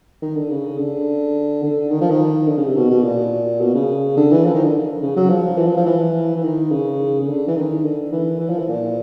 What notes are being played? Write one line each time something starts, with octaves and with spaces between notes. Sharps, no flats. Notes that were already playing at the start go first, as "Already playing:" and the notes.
D#3
D3
C#3
D3
D3
D#3
F3
D#3
D3
C#3
C3
B2
B2
A#2
B2
C#3
D3
E3
F3
D#3
D3
C#3
F#3
F3
E3
F3
F3
E3
E3
D#3
C#3
C#3
D3
E3
D#3
D3
E3
E3
F3
E3
A#2